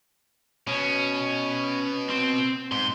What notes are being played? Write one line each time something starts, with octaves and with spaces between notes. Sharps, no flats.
B2 C#4
C4 C6
G#2 C6